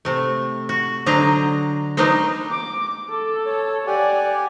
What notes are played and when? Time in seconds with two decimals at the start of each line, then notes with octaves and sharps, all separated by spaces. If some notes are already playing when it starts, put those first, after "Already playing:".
0.05 C3 A3
0.69 F#4
1.06 D3 F#3 D4 C5 D#5 A#5
1.97 F#3 B3 D4 D#4 A#4 C5
2.50 D6
3.11 A4
3.46 C#5
3.87 G4 D5 F#5 G#5